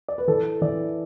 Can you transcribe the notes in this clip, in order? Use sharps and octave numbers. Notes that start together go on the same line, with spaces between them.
D5
B4
E3 A4
E3 D5